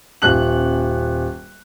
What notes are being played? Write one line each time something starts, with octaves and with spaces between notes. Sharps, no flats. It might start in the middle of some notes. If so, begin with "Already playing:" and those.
D#1 F#6 F#7